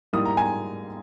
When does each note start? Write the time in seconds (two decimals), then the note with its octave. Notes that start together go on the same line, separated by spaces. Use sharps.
0.13 G#2 G3 A#3 E4 D#6
0.25 A#5
0.37 G#5